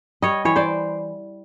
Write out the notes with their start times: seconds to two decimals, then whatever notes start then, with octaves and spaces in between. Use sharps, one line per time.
0.22 G3 C#5 D#5
0.45 E3 C#5
0.56 C5 D5